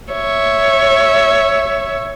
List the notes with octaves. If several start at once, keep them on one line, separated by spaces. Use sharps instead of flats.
C#5 E5